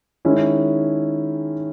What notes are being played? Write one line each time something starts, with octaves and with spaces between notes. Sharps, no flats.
D#3 G#3 C#4 E4